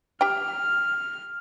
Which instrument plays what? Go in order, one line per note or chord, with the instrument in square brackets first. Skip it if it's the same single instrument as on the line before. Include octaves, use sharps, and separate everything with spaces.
[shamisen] G4 G5 [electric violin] F6